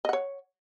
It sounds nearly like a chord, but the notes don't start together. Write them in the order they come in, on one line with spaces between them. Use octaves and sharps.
D#5 F#5 C#5